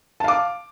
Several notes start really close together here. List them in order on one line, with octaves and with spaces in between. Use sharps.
A5 F5 D6